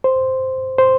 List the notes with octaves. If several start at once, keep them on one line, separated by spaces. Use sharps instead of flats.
C5
C5